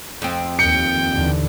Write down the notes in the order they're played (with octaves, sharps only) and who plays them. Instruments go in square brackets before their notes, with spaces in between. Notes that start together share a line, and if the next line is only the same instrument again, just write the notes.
[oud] F2 C4
[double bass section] D#2 [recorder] G5 [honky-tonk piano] C#7
[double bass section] D#2 D3 E3